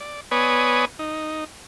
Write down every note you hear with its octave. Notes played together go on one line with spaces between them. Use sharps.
D5
B3 B4 C#5 D5 G#5 D#6
D#4